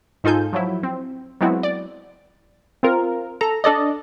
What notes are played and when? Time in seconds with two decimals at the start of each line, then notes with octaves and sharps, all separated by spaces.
0.24 G#2 D#4 F4 A4 G#5 G6
0.53 F3 F#3 E4
0.83 C4
1.41 F#3 G#3 B3 C4 E4 F#4
1.63 D5
2.83 C4 F4 A#4
3.41 A4 A#5
3.64 D4 A4 D5 D#5